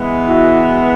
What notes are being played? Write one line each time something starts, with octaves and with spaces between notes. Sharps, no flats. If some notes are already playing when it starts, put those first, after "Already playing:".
Already playing: E3 G#3 B3
E4 F#4